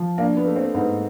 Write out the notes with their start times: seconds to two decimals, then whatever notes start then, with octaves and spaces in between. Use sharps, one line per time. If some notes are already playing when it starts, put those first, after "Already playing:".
Already playing: F3
0.18 A#3 D4
0.37 B3
0.46 A3
0.56 C4
0.74 G#2 B3